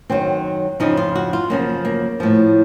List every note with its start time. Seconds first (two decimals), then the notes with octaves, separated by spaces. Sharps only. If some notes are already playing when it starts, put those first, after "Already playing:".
0.10 F#2 D#3 F#3 C4
0.80 F2 C#3 F3 D#4
0.97 F4
1.15 F#4
1.33 F4
1.50 F#2 C#3 F3 A#3
1.85 A#3
2.20 A2 F3